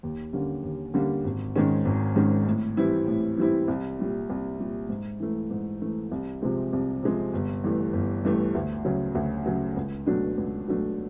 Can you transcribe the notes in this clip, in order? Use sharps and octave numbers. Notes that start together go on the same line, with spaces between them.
D#2
D3 G3 A#3 C#4
D#2
D3 G3 A#3 C#4
G#1
G#2 D#3 G#3 C#4
G#1
G#2 D#3 G#3 C#4
A2
E3 G3 C4 E4
A2
E3 G3 C4 E4
C2
A#2 G3
C2
A#2 G3
G#2
E3 A3
G#2
E3 A3
C2
C3 F3 G#3 C4
C2
C3 F3 G#3 C4
G1
G2 E3 A3
G1
G2 E3 A3
D2
C#3 F#3
D2
C#3 F#3
C#2
B2 F#3 A3 D4
C#2
B2 F#3 A3 D4